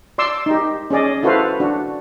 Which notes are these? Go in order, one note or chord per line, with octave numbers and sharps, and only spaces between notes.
D5 C6 D6 E6
D#4 G4
C#4 G#4 D5 D#5
E4 F#4 A4 B4 C5 F5
D4 F#4